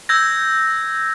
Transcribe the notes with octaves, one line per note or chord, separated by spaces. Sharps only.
E6 G6 G#6 A#6